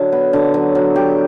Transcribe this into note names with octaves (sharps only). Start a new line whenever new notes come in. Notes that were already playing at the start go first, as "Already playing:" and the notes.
Already playing: D3 F#3
B3
D3
F#3
F#3
G4